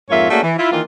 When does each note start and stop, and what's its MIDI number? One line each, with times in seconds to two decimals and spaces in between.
0.10 0.28 41
0.10 0.28 44
0.10 0.28 58
0.10 0.28 65
0.10 0.28 73
0.10 0.28 76
0.30 0.41 57
0.30 0.41 58
0.30 0.41 61
0.30 0.41 62
0.30 0.41 66
0.30 0.41 68
0.43 0.53 52
0.58 0.71 64
0.58 0.71 65
0.71 0.81 51
0.71 0.81 52
0.71 0.81 58
0.71 0.81 65